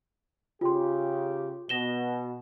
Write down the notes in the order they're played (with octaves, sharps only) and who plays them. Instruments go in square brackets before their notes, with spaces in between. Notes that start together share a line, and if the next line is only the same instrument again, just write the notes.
[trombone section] C#3 G4 [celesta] F4 C6
[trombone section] B2 [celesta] A#6 E7 G7